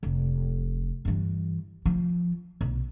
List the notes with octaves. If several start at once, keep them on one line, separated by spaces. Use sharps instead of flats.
F1
G2 E3
F3
B1